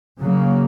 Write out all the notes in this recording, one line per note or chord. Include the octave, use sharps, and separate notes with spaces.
C#3 F#3 A#3